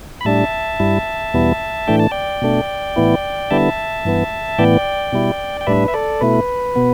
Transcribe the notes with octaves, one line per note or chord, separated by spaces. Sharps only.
B5
A2 G3 D4 E5 A5
G2 G3 E4
E2 B2 G3 B3 E4
A2 E3 A3 D4 G5
A5
D5 G5
B2 A3 D4
A2 E3 B3 E4
D3 G3 B3 E4 E5 A5
G2 E3 B3
A2 E3 B3 D5 G5
B2 G3 E4
G5
A2 G3 D4 B4 E5
E5
A4 D5
B2 A3 E4 B4
B2 B3